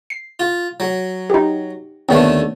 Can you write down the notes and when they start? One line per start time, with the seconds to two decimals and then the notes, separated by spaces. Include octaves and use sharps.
0.10 C7
0.40 F4
0.80 F#3
1.30 D#4 G4
2.09 D#2 D3 A3 B3 C#5